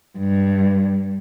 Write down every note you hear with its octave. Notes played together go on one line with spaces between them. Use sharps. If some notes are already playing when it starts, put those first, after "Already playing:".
G2